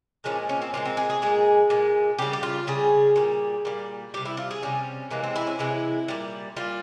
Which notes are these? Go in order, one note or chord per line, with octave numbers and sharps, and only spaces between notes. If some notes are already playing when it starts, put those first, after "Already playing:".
A#2 F3 G#3 C#4
C#4
C4
A#2 F3 G#3 C4
C4
G#4
G#4
A#2 G#3 G#4
A#2 G#3
C#3 G3 G4
G4
F4
C#3 G3 G#4
A#2 G3
A#2 G3
C3 G3 G4
E4
F4
G#4
C3 G3 C#4
C3 E3 G#3 A#3
C4
E4
C#4
C3 E3 G#3 E4
A#2 G3
A#2 G3 F4